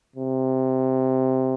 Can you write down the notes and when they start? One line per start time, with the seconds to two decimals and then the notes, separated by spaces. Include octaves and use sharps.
0.16 C3